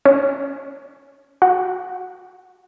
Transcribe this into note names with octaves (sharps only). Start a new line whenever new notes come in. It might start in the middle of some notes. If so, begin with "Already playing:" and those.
C#4
F#4